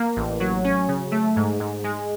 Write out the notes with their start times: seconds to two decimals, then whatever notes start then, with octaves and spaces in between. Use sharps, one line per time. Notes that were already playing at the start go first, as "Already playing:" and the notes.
Already playing: A#3
0.16 A1
0.40 F#3
0.64 C#4
0.88 C#3
1.12 A3
1.36 G#2
1.60 G#2
1.84 G#3